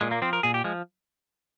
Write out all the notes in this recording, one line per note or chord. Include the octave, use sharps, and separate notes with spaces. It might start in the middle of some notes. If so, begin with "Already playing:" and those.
A#2 G#3
A#3
F3 C4
A#4
A#2 G#4
G4
F3 G#3